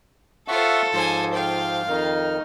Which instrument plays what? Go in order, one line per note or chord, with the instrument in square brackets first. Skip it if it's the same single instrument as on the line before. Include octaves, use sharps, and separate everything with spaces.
[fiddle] F4 C5 [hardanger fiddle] A4 [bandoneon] E5 F#5 C#6
[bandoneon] G#2 F3 [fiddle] C5 G#5
[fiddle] F4 F5 [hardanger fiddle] G5
[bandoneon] F2 D#3 F6 [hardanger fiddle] D#4